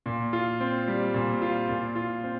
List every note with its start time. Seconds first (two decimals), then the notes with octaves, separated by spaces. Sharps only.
0.06 A#2
0.33 F4
0.60 C4
0.88 G3
1.14 A#2
1.42 F4
1.69 A#2
1.95 F4
2.24 C4